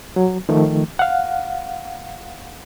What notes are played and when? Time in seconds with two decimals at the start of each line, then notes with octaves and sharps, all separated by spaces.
0.16 F#3
0.49 D#3 F3 A3
0.99 F5 F#5